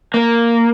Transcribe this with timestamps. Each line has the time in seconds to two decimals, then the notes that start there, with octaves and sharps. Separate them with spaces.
0.14 A#3